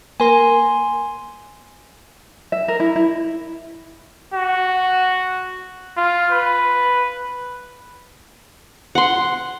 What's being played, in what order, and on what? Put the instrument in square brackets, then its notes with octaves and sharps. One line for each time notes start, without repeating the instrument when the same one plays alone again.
[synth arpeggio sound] A#3 A#4 [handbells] G#5 C6
[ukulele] E5
A#4
E4
E4
[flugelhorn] F#4
F4
B4
[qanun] F#5 C6